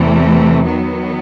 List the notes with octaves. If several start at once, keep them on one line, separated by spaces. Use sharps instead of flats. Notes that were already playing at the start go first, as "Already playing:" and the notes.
Already playing: E2 C3 E3 A3
D#3 F#3 B3